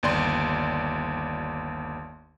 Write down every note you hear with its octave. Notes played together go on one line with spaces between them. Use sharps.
G1 D#2 D5 C6